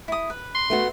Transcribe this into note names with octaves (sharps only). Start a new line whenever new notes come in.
E4 D#6
B4
C6
A3 B3 F#4